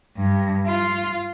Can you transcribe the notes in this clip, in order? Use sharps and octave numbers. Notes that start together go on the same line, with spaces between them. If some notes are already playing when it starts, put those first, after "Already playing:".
G2
F4